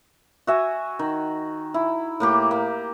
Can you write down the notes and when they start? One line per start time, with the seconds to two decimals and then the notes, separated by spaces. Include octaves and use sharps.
0.47 F#4 E5 G#5
0.99 D#3
1.74 E4
2.20 A2 A#3 G4
2.51 A#3